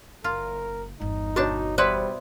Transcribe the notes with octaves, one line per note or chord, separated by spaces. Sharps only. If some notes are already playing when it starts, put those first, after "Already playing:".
F#1 F4 A#4
G1 E2 D#4
B2 D4 F#4 C#5 A5
G3 B3 E4 B4 C5 D5 C6